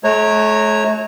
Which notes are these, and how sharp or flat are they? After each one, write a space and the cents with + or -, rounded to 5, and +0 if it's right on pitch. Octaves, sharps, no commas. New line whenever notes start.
A3 -45 C#5 -20 A#5 -15